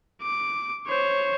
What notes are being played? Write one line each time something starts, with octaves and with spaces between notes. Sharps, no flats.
D6
C5 C#5